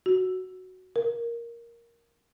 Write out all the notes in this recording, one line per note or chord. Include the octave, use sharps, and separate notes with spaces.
F#4
A#4